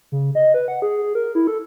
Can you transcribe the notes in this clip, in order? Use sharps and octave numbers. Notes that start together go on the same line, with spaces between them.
C#3
D#5
B4
F#5
G#4
G#4
A#4
E4
A4